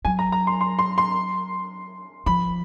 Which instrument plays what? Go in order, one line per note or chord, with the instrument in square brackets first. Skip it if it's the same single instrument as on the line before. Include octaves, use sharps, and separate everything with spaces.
[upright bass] F#3 [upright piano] G#5
[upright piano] A#5
A#5
C6
C6
C6
C6
[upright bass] F3 [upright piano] B5